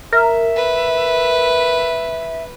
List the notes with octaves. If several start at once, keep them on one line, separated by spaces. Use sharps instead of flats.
A#4 E5
B4